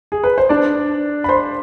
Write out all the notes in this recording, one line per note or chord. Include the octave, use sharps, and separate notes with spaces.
G#4
B4
C5
D4 D5
B5
C5 C6